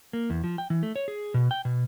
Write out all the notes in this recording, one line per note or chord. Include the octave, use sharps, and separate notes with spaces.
A#3
E2
F3
G5
E3
A3
C#5
G#4
B2
G5
B2